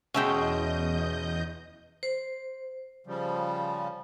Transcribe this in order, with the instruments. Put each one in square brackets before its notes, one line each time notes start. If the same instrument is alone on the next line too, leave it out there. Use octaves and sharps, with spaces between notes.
[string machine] E2 D#5 G6 [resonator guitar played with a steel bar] B2 G#3 [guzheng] C#4 E5 G5
[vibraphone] C5
[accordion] C#3 F3 G3